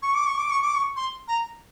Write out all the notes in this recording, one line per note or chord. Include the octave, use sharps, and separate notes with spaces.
C#6
D6
C#6
D6
C#6
D6
C#6
C6
A#5